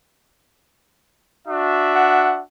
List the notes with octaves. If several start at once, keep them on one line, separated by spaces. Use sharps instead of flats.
D4 F#4 E5
F#5